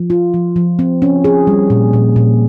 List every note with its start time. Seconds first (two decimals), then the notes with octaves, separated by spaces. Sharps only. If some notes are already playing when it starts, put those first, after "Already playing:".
Already playing: F3
0.10 F4
0.34 F3
0.56 F3
0.79 C4
1.02 C#4
1.24 G#4
1.47 G3
1.70 A#2
1.93 A#2
2.16 A#2